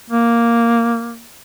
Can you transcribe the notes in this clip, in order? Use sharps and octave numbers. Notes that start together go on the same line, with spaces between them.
A#3